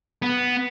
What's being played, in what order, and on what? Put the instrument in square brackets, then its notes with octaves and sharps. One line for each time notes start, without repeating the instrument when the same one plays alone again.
[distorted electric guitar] B3